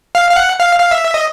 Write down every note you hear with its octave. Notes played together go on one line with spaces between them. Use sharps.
F5
F5
F#5
F5
F5
E5
D#5